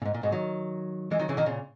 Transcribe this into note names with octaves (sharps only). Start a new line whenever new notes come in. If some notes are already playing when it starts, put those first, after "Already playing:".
A#2
G#2
A#2
G#2 B2
D#3 F#3
E3 G#3
D#3 F#3
C#3 E3
B2 D#3
A#2 C#3